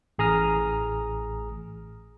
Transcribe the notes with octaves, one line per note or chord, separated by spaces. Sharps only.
A1 G#4 A#5 D#6 F6